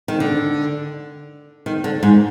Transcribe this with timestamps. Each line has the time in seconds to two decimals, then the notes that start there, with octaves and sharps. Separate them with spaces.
0.08 D#3
0.20 D3
1.66 D#3
1.84 D3
2.03 G#2